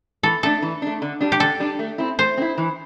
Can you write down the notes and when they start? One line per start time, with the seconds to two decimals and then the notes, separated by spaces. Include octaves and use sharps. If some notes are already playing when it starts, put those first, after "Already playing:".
0.23 E3 A4
0.43 A3 D4 A4
0.62 E3
0.82 A3 D4
1.02 D3
1.21 G3 D4
1.32 G4
1.40 D3 A4
1.60 G3 D4
1.79 A3
1.98 C4 E4
2.19 A3 C5
2.37 C4
2.41 E4
2.58 E3